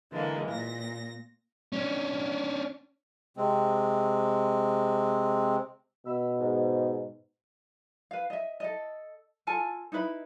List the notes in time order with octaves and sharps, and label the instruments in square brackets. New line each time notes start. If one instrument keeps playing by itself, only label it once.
[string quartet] D3 E3 G#3 A#3
A#2 A#6
[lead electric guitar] C#4 D4
[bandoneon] C3 G#3 C4
[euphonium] B2 [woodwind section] B4 B5 E6
[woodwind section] G#2
[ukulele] B4 F5
D#5 E5
A4 D#5
F4 A4 G#5 A5
D#4 E4 B4 B5